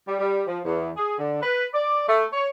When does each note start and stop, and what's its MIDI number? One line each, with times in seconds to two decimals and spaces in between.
0.07 0.19 55
0.20 0.42 55
0.47 0.58 53
0.65 0.89 40
0.97 1.15 68
1.18 1.38 50
1.42 1.65 71
1.73 2.03 74
2.07 2.23 57
2.33 2.47 73